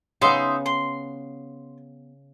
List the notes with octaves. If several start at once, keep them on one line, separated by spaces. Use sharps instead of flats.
C#3 B3 D#4 E5 C6
C6